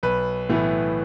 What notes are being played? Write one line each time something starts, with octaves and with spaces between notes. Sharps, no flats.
B1 B4
A2 E3 B3